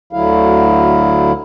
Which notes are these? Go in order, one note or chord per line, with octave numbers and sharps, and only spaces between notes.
D2 D3 F#3 E4 F5